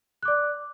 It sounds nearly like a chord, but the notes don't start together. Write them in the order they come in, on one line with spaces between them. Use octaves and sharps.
F#6 D6 D5